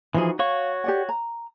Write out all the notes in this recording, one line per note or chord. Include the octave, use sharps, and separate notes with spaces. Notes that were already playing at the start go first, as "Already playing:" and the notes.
E3 F3 D#4 E4 F#4 G#4
F#4 C#5 F5 C#6
G4 D5 F#5
A#5